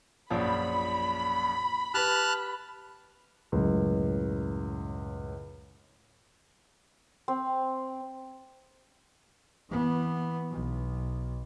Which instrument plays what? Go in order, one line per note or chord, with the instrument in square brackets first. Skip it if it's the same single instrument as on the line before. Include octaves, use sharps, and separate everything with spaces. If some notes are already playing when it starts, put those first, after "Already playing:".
[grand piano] A#1 F#2 F3 [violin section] B5
[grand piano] G4 B4 [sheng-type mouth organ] A5 F6 F#6
[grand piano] C#2 F#2 A2
[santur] C4
[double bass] E3 B3
B1